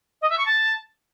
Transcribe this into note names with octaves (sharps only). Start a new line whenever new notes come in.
D#5
E5
C#6
A5